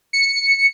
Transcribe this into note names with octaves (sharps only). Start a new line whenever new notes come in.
C#7